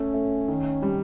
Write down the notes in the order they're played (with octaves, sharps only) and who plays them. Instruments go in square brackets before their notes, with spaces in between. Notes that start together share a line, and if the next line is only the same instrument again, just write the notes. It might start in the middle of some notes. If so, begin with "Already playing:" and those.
Already playing: [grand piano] A3 [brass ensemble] C#4
[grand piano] A3
D#3
G3